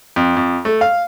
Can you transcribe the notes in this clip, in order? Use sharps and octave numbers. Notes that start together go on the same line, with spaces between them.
F2
F2
A3
F5